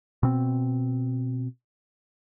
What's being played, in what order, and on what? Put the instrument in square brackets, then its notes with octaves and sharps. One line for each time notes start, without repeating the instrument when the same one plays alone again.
[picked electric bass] B2 C4